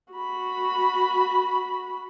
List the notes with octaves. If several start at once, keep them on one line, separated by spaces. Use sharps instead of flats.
F#4 B5